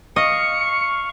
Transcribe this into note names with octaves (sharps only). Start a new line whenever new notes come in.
D#5 F5 C#6 C#7